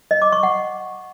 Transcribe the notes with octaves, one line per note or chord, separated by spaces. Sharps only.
D#5
D6
C#6
F#5